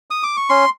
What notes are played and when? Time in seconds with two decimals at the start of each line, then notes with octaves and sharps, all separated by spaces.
0.11 D#6
0.23 D6
0.37 C#6
0.49 C#4 C6